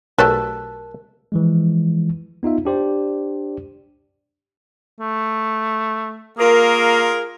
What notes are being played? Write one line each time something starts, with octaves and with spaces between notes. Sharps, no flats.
B1 A3 G4 A4 A#4 A5 F#6
E3 F3 G#3
B3 D#4 F4 E5
D4 G4 C5 D5
A3
A#3 F4 G#4 A#4